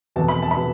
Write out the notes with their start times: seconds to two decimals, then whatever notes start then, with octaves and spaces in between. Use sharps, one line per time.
0.16 F1 E2 B2 B3 A5
0.28 B5
0.42 A5
0.51 B5
0.57 B2 B3